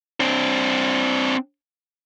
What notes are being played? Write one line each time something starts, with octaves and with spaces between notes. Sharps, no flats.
C4 D4